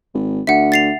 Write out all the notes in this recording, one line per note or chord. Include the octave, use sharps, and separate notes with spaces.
G#1
D2 E5 F#5
A6 C7 F7